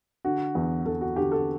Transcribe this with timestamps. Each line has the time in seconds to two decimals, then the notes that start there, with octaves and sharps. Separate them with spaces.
0.25 D3 F#4
0.55 E2
0.86 E2 A4
1.01 F#4
1.16 D3 G4
1.32 A4